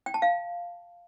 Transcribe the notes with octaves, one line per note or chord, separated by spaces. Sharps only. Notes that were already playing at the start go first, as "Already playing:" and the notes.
G5
A5
F5